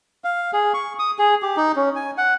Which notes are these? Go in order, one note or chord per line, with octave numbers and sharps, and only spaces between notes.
F5
G#4
C#6
D#6
G#4
G4
D#4
C#4
G#5
F#5